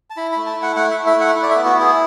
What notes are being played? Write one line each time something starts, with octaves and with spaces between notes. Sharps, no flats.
A5
E4 B5
A3 B5
A5
E4
F#5
A3 F#5
E5
E4
E5
A3 F#5
E4
D5
B3 E5
F#4
E4
G#4